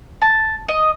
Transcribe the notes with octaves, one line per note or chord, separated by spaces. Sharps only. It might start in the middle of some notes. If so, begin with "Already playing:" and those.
A5
D#5